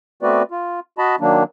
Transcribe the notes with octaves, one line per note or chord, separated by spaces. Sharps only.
A3 B3 C4 F#4 B4 D5
F4
F#4 D#5 A5 B5
D#3 F#3 A#3 D4